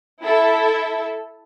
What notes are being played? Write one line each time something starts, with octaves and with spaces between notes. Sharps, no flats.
E4 A4 E5